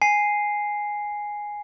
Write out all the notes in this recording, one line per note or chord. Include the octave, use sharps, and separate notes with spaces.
G#5 C7